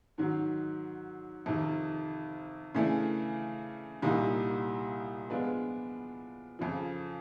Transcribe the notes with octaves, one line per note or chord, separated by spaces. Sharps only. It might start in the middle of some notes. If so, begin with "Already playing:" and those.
G#2 D#3 F#3
F2 C3 D#3
C#3 E3 A3 D4
C2 A#2 G3 A#3 D#4
F3 G#3 B3 D4 F4
F2 C#3 F3